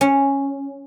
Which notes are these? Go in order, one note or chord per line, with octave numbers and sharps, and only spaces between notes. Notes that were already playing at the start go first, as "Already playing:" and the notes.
C#4